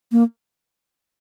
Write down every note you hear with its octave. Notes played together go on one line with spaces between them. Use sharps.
A#3